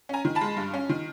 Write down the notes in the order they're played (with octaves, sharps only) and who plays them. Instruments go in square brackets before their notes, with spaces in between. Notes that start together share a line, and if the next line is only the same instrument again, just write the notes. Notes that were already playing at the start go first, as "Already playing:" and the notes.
[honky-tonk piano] C#4 G#5 A#5
D#3
A5 B5
G#3
G2
C#4
D#3